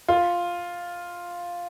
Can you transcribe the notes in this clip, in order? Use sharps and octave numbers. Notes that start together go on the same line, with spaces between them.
F4